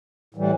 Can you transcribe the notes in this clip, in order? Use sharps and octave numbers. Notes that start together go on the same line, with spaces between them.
A2 E3 G3